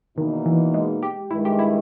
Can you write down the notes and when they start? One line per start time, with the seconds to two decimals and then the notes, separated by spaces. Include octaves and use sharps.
0.17 E2 B2 D#3 A#3 D#4
0.46 E3
0.74 G#3
1.03 G4
1.31 G2 D#3 G#3 E4
1.45 G4
1.59 E4